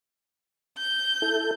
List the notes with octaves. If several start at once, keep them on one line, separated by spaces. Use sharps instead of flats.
G6
E4 A4